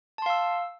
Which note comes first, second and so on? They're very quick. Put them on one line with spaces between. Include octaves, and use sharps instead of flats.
A5 C6 F5 E6